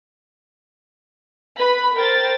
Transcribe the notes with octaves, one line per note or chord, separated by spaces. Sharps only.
B4 B5
A#4 C5 G5 A6